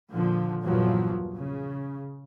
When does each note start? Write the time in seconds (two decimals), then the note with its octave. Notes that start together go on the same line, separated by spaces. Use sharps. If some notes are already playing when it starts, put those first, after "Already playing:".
0.12 A#2 D3 F3
0.64 A#1 E2 G2 A#2 F3 F#3
1.35 C#3